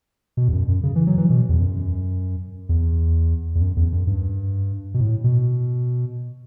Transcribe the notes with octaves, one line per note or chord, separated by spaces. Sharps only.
B2
E2
F#2
F#2
C#3
E3
F#3
E3
B2
E2
F#2
E2
E2
F#2
E2
F#2
G2
B2
A2
B2